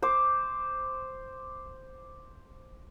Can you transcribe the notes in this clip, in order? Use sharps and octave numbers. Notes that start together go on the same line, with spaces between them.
C5 D6